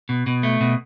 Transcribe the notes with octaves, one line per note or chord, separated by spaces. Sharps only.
B2
B2
A3
B2